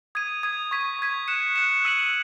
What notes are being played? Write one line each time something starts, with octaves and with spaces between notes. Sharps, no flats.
D#6 G#6 D#7
D#6 G#6 D#7
C#6 G#6 B6
C#6 G#6 B6
F#6 C#7 E7
F#6 C#7 E7
E6 B6 D#7 F#7